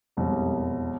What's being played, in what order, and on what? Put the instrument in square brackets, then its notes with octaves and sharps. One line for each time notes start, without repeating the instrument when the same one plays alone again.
[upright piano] E1 C2 F2